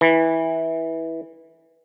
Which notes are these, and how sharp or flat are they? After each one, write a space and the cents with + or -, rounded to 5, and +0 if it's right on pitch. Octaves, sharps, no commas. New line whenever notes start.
E3 -15